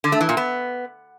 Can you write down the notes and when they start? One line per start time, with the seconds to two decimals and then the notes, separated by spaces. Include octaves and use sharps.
0.04 D3
0.12 A3
0.21 E3
0.29 A#2
0.37 B3